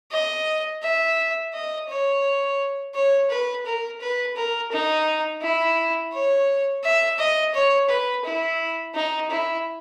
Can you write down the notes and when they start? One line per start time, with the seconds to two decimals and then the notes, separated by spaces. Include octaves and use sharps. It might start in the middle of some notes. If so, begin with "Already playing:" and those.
0.11 D#5
0.82 E5
1.53 D#5
1.88 C#5
2.94 C#5
3.30 B4
3.66 A#4
4.01 B4
4.36 A#4
4.71 D#4
5.42 E4
6.13 C#5
6.84 E5
7.18 D#5
7.54 C#5
7.89 B4
8.25 E4
8.94 D#4
9.31 E4